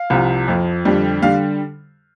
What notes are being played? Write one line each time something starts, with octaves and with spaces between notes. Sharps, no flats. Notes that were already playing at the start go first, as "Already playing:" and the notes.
Already playing: F5
C2 C3 F3
F2 F3
F2 D3 G3
D3 G3 F5